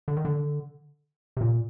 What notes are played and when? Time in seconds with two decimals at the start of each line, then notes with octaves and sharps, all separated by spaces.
0.08 D3
0.17 D#3
0.25 D3
1.37 C3
1.41 A#2